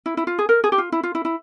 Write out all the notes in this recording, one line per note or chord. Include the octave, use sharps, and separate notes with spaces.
E4
E4
F4
G#4
A#4
G#4
G4
F4
E4
F4
E4
E4